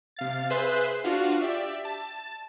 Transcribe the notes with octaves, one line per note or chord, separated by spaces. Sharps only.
C3 F5 A6
G#4 B4 C5 E5 C6 F#6
D4 F4 F#4 F5
G4 D5 E5
A5